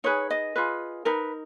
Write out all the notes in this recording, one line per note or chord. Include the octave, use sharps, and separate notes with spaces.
D#4 G#4 B4 C#5
D#5
F4 G#4 B4
D#4 A#4 B4